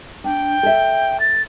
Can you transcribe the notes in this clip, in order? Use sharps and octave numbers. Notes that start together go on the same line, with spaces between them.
D4 G5
A4 E5
A6